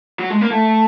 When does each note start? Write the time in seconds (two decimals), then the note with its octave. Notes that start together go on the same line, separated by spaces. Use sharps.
0.19 F#3
0.30 G#3
0.41 A#3
0.51 A3